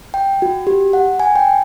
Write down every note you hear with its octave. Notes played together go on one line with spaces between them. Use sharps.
G5
F#4
G4
F#5
G#5
G5